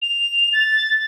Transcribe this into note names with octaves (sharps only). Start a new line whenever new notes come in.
F7
A6